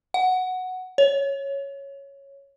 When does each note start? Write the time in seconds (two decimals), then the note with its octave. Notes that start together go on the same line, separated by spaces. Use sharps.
0.14 F#5
0.98 C#5